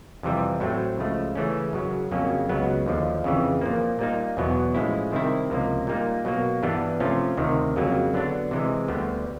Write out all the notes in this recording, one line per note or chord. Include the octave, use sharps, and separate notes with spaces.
F2 C3 E3 G3
A2 F#3 A3 C4
C#2 C#3 F3 A3
C#3 E3 A3 C#4
F#2 C#3 F#3
F2 C#3 F#3 A#3 C#4
C#2 C#3 F#3 B3
D#2 D3 F3
F2 C#3 E3
A#2 F3 A#3
A#2 G3 A#3 D#4
E2 B2 F#3 B3
A2 F3 G#3 C#4 E4
C3 D#3 G3 C4 E4
C#2 C3 F3 A#3
A#2 G3 A#3 D#4
B2 F#3 A#3
G2 E3 G3 B3 D4
C3 F3 A3 C#4 F4
D2 C3 D#3
F2 C#3 F#3 A#3
D3 F#3 B3 D4
C3 E3 G#3
D2 D3 G3 B3